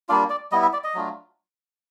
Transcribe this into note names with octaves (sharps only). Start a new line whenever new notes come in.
G3 A#3 D4 F4 D5
D5
G3 B3 E4 D#5
E5
D5
D#5
F#3 A3 D4 F4